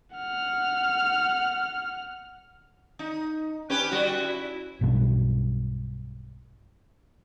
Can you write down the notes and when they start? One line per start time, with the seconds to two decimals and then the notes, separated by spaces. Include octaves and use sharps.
0.16 F#5 F6
2.99 D#4
3.70 C#4 G4 B4
3.91 G3 F#4
4.22 E4
4.81 B1 G2 B2